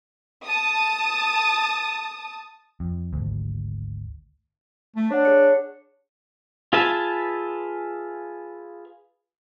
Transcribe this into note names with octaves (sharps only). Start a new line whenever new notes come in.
A5 D#6
F2
G#1 D2
A3
D4 C#5 F#5
G#4 C#5 C#7
F4 G#4 B4 E5 A5